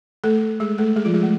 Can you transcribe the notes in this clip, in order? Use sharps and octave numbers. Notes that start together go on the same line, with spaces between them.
A3 A4
G#3 G#4
A3 A4
G#3 G#4
F3 F4
G#3 G#4
A3